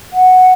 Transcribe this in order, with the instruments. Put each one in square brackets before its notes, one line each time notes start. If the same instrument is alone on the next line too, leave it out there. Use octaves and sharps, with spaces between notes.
[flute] F#5